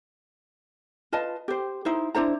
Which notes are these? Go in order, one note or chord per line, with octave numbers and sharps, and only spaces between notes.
F4 B4 D#5 A5
G4 C5
D#4 E4 C5
D4 E4 C5 A#5